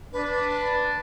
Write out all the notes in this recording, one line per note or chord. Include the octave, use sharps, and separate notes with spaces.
D4 B4